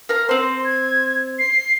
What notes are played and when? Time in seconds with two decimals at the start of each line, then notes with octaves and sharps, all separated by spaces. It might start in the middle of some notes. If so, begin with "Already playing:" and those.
0.09 A#4 F5 A#5
0.29 C4 C5 C6
0.64 G#6
1.39 C7